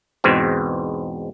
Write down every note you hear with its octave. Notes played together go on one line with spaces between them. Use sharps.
E2 G#2 B2 C4